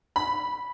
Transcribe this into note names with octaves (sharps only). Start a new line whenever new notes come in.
B5